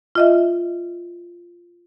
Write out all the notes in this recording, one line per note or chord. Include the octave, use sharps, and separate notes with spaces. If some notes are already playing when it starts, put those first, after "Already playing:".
F4 D#5 E5